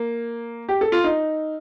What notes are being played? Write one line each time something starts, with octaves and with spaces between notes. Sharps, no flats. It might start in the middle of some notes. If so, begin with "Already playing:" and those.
Already playing: A#3
G4
A4
F4
D#4